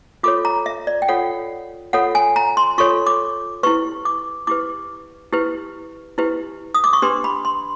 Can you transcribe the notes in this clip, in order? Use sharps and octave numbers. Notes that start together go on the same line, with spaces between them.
F4 A4 C#5 D6
A#5
E5
D5
G5
F4 A4 C#5 F#5
F4 A4 C#5 F#5
G#5
A#5
C6
F4 A4 C#5 C#6
D6
E4 G4 B4 C#6
D6
E4 G4 B4 D6
E4 G4 B4
E4 G4 B4
D#6
D6
C#6
D4 G4 B4 C6
B5
C6